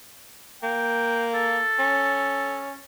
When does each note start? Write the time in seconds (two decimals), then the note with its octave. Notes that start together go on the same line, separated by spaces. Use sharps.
0.63 A#3 G5
1.34 A4
1.79 C#4